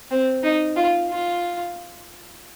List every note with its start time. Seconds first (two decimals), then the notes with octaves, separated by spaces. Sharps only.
0.11 C4
0.44 D#4
0.76 F4
1.09 F4